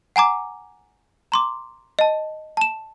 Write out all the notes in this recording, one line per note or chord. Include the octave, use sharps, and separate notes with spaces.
F#5 G#5 A#5 D6
A#5 C6 D6
D#5 A5
A5 E7